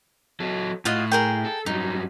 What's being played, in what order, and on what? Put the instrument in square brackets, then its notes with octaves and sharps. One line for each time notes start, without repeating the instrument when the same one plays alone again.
[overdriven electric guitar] F#3 A4
[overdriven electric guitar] A2 [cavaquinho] F4 F#4 D#5
[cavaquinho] G#4 A#4 G5
[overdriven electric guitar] A4
[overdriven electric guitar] G2 F#3 [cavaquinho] D#4